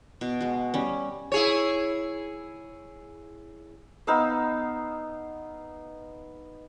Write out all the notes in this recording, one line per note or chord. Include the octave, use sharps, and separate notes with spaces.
B2
G#3 F#4
G3 C#4
E4 G#4 C#5
B3 D#4 F5 E6